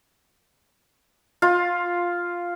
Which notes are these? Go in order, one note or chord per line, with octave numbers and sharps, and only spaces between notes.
F4